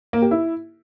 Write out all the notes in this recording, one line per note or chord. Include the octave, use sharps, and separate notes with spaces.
A#3
G4
E4